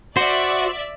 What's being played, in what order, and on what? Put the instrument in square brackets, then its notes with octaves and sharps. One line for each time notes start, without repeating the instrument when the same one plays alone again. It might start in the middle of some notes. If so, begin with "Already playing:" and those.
[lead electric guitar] F#4 [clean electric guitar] C5 [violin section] D5 E5